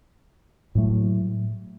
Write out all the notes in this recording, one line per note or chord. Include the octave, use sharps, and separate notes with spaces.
A2 F#3 A3